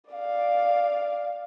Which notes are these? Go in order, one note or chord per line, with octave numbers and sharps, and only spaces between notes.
D5 F5